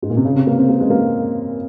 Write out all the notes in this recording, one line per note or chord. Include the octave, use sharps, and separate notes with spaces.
G#2
A#2
C3
C#3
C3
A#3
C4
A#3
G#3
A#3